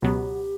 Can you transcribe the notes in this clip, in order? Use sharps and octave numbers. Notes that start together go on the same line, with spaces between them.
C#2 B2 F#3 B3 G4